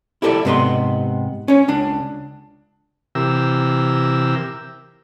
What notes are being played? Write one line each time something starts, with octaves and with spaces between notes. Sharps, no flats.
E4 G4 A4 B4 D5
G#2 C3 B3 A4 D#5 C6
C#4 C#5
C#2 D4
C3 E3 G4 A#4 E6